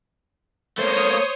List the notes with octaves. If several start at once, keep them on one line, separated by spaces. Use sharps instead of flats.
A3 A#3 C5 C#5 D#6